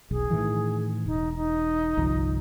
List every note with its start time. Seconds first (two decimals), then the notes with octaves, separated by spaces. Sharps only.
0.11 E1 B1 G#4
0.30 A2 D#3 E3
1.06 E1 D#4
1.36 D#4
1.97 G1 C2 F3